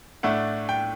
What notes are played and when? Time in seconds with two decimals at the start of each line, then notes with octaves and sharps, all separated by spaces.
0.23 A2 A3 D4 F#5
0.69 G5